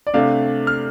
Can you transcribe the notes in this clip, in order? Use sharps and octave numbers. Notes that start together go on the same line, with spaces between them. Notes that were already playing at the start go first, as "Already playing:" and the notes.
D5
C3 A3 D4 F5
F6